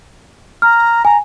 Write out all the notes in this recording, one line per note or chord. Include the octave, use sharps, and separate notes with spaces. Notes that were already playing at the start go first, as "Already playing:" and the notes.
A#5 F6
G#5 A#5